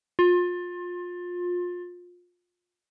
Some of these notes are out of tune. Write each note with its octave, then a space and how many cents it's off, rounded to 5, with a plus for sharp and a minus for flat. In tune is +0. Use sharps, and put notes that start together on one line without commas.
F4 +25